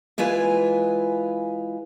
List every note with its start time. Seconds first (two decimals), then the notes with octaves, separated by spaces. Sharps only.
0.18 E3 G#3 E4 F4 B4 G#5